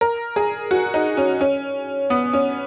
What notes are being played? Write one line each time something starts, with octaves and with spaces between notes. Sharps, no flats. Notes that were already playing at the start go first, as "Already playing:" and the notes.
A#4
G#4
F#4
D#4
C#4
C#4
B3
C#4